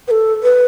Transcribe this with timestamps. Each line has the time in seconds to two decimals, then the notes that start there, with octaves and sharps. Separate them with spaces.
0.08 B4
0.11 A4
0.43 B4